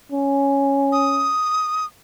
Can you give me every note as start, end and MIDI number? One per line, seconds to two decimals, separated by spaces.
0.12 1.34 61
0.92 1.86 87